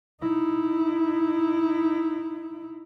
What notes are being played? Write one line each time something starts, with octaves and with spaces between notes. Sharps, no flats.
D#4 E4